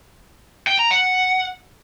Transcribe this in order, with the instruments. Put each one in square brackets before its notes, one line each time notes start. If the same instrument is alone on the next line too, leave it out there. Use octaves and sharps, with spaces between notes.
[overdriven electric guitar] G5
A#5
F#5